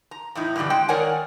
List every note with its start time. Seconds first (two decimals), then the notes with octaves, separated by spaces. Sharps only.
0.11 A#5
0.35 E2 A2 D#4 E4
0.56 G2 A#2 D3 E3 G3
0.70 G#3 G5
0.88 D#3 A#4 C#5 D5 F#5 G#5